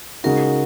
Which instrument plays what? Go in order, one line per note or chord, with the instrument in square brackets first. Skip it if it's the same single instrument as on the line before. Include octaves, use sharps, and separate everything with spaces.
[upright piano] C#3 G#3 D#4 F#4 [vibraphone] A#4